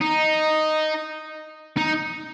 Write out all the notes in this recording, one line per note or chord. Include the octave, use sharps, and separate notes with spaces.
D#4
D#4